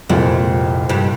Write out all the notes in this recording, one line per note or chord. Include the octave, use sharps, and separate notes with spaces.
C2 F2 A#2 G#3 C4 F4
G2